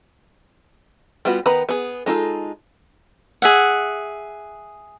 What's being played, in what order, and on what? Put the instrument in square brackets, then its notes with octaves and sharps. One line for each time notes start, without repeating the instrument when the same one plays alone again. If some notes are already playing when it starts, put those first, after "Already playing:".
[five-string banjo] G3 B3 F4 F#4
D#3 B3 B4 A#5 B5
B3 G#4
G#3 D#4 F4 A4
[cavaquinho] G#4 E5 F#5